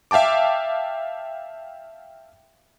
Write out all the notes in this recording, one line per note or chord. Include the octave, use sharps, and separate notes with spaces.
E5 F5 G5 A5 D6